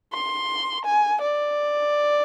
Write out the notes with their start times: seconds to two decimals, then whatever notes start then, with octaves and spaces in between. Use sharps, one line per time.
0.13 C6
0.85 G#5
1.21 D5